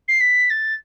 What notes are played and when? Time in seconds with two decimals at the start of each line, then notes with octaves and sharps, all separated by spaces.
0.08 C7
0.20 B6
0.50 A6